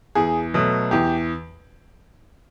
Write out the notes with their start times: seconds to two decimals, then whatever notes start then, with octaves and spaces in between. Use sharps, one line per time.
0.15 E2 G#4
0.54 B2 F#3 A3
0.91 E2 G4